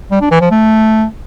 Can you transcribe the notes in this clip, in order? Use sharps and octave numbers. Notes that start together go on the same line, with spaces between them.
G3
D4
E3
F3
A3